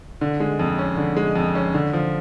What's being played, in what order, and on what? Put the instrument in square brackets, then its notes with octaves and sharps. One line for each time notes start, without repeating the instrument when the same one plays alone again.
[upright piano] D3
G#3
F2
C#4
D3
G#3
F2
C#4
D3
F3